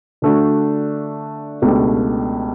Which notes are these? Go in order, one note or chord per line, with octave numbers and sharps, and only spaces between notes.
D3 A3 D4 F#4
C#2 B2 A3 D4 G4